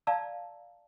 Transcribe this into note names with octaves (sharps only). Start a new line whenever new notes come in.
D5 F5 A5 A#5 E6